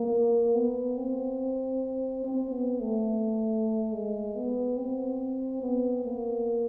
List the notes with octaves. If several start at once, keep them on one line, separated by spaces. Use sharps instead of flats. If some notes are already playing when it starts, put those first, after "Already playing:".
Already playing: A#3
B3
C4
C4
B3
A3
G#3
B3
C4
B3
A#3